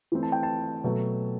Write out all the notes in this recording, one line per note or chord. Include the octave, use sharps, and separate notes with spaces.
E3 A3 C4
A5
G5
A5
B2 F#3 A3